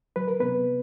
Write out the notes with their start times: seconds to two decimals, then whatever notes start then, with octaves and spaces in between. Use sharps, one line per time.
0.16 F#3 B4
0.28 A#4
0.40 C3 B3 B4